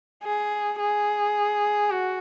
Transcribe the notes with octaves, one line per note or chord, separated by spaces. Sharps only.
G#4
G#4
F#4